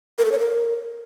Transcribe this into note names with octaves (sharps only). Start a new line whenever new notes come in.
A#4
A4
C#5
A#4